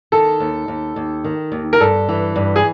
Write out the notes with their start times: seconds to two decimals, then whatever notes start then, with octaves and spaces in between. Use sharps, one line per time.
0.12 D#3 A4
0.40 D#2
0.68 D#2
0.96 D#2
1.24 D#3
1.52 D#2
1.73 A#4
1.80 G2 A4
2.09 E3
2.36 G2
2.56 G#4